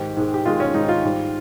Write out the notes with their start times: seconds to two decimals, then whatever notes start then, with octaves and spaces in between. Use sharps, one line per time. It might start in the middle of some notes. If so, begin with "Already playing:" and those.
Already playing: G#2 D#3 G4
0.16 G#2 D#3 G#3
0.34 G4
0.45 G#2 D#3 G#3 F4
0.60 C#4
0.74 G#2 D#3 G#3 D#4
0.88 F4
1.03 G#2 G3